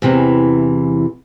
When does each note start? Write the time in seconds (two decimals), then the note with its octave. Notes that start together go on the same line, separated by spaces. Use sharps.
0.02 E2 C3 E3